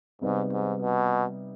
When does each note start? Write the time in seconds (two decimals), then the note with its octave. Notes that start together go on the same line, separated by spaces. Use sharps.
0.21 G#2 C3 G3 B3 D#4
0.52 G#2
0.82 B2